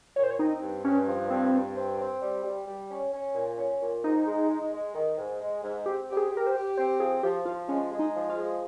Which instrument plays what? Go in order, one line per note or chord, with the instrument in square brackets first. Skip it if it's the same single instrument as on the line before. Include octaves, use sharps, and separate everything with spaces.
[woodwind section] A#2 [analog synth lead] C#5
[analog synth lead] C5
C#5
[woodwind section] C4 [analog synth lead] D#4
[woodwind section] G2
[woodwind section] G2 [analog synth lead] C#4
[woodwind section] F3
[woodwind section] G2 [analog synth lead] C4
[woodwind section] G2
C4
C4
G3
G3
G3
C#4
C#4
A#2
C#4
A#2
[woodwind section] G#2 [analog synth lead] D#4
[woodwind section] G#3
G#3
G#3
D#3
G#2
G#3
G#2
[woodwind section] C4 [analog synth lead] G4
[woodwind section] G4
[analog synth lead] G#4
[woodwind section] G4
[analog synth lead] A#4
C5
[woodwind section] G4
[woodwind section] C4 [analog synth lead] C5
[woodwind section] F3 [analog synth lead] G#4
[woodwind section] F3 [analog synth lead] G4
[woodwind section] F3 [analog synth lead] F4
[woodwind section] G#3 [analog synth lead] C#4
[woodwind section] G#3
[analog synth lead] D#4
[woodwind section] F3
[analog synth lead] F4
[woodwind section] G#3